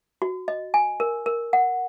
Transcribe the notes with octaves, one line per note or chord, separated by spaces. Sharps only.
F#4
D#5
G#5
A#4
A#4
F#5